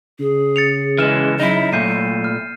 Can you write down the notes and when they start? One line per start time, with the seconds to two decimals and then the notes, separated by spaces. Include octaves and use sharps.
0.19 C#3 G#4
0.56 A6 C#7 F7
0.99 E3 G#3 F6 E7
1.40 F#3 D#4 E4
1.73 A#2 A3 G6 C7 D#7
2.24 F6